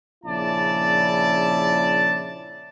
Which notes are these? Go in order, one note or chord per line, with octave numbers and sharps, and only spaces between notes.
A#1 C#3 E4 D5 A5